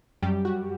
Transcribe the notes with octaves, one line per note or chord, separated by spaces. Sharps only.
F#2 G3 G4
F#4